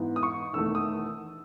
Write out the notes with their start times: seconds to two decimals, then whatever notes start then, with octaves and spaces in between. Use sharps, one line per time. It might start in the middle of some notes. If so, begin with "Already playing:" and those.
Already playing: G#2 E3 B3 D#4
0.16 D#6
0.23 C#6
0.53 E1 E2 D#3 A3 E6
0.75 D#6